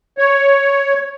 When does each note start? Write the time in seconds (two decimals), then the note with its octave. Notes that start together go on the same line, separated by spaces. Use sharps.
0.18 C#5